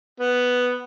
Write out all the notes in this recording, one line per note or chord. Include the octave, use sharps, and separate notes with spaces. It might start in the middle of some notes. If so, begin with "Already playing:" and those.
B3